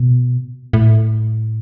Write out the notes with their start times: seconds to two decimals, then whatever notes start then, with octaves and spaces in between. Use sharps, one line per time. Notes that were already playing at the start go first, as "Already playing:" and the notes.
Already playing: B2
0.73 A2